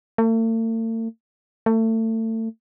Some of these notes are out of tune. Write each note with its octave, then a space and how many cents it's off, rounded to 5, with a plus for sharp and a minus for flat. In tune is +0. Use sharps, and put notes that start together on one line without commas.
A3 +45
A3 +30